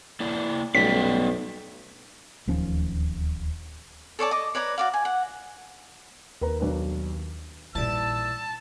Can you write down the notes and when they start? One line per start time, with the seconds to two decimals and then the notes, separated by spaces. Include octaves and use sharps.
0.20 A#3 E4 D5
0.75 B1 G3 A3 B3 C#4 D5 G5 B6
2.47 D1 D#2 F3 C#4
4.19 A4 C#5 D5 A5
4.31 D#5 D6
4.55 B4 C#5 D5 A#5
4.78 F#4 D5 F5
4.94 G#5
5.05 F#5
6.41 D#2 A#4 B4 A#5
6.60 B1 D4 B4
7.75 A#1 E3 G3 D#4 A5 E6